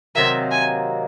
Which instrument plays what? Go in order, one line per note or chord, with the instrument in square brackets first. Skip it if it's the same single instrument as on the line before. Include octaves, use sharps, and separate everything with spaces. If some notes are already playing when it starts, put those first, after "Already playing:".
[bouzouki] C3 D#3 F#3 A#3 [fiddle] E5
[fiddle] G#5